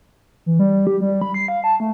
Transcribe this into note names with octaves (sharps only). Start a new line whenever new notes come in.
E3
G3
G4
G3
B5
C7
F5
A5
A3